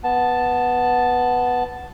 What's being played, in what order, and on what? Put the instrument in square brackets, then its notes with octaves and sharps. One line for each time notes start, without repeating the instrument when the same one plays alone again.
[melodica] B3 A5